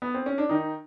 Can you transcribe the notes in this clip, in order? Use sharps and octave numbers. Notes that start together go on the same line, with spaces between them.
B3
C4
C#4
D4
D#3 D#4